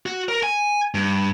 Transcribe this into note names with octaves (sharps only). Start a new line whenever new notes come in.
F#4
A#4
G#5
G2